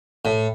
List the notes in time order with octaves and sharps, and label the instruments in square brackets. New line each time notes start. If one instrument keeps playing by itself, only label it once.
[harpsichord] A2